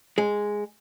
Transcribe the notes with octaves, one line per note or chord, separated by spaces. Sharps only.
G#3